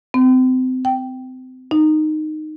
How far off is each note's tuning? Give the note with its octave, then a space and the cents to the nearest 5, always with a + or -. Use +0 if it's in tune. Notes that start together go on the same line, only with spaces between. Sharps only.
C4 -30
G5 -10
D#4 -10